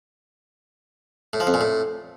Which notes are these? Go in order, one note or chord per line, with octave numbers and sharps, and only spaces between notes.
A2
F3
F2
A#2
A2